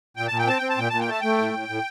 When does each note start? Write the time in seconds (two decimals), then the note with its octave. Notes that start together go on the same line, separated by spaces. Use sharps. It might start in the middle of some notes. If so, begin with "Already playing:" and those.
0.16 A#2 G5
0.28 A#2 A5
0.38 G5
0.47 C4 A5
0.58 C4 G5
0.69 A5
0.77 A#2 G5
0.90 A#2 A5
1.00 G5
1.08 A3 A5
1.21 A3 G5
1.38 A2
1.54 A2
1.69 A2